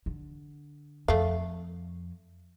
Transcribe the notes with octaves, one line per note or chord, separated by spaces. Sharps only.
D3
F2 A3 F5